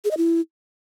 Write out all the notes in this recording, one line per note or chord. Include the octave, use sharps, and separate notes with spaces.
G#4
D#5
E4